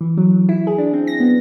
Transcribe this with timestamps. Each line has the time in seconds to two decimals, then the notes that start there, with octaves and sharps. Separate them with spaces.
0.01 E3
0.18 F#3
0.49 E4
0.67 G#4
0.78 D4
0.93 C4
1.07 A#6
1.20 B3